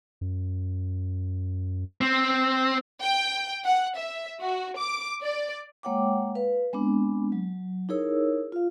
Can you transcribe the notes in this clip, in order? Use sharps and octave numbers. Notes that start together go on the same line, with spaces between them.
F#2
C4
G5
F#5
E5
F#4
D6
D5
G#3 A#3 C#5 F#5 G5 D6
B4 F5
G#3 B3 C4 D4
F#3
D#4 E4 G#4 A#4 C#5 E6
F4 F5